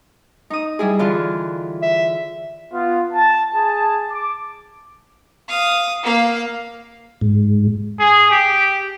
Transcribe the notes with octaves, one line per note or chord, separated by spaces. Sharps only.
D#4 D#6
G3 E4 G#4
D3 E3 F4
E5
B3 F4
A5
G#4 A5
D6
F5 D#6
A#3 F5
G#2
G#4
G4